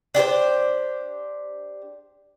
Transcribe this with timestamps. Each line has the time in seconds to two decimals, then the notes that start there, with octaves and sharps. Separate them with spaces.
0.15 D4 G4 A#4 C5